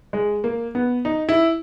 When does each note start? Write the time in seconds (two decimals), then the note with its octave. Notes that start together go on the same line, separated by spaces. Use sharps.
0.13 G#3
0.44 A#3
0.75 B3
1.05 D#4
1.29 E4